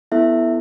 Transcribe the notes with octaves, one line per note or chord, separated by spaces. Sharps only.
B3 E4 A4 E5